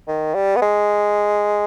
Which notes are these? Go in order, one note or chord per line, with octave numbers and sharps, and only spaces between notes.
D#3
G3
B3
G#3